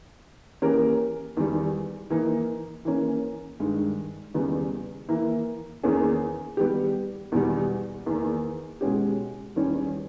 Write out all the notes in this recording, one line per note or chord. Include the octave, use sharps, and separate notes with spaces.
E3 A#3 C#4 G4 A#4
E2 D#3 G3
E3 A#3 D#4
E3 A#3 C#4
G2 D#3 G#3
E2 C#3 G3 B3 D#4
E3 A#3 E4
E2 D#3 A#3 C#4 G#4
G3 B3 G4
E2 B2 G3
E2 D#3 A#3
B2 G#3 C#4 G4
E2 D#3 G3 C#4 G4